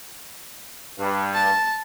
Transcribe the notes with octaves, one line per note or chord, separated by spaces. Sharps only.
G2
A5